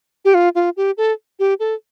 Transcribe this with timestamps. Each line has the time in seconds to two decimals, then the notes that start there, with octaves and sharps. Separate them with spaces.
0.25 G4
0.34 F4
0.55 F4
0.77 G4
0.97 A4
1.39 G4
1.60 A4